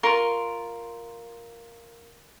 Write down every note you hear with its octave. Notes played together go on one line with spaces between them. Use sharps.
F4 A#4 C6 C#6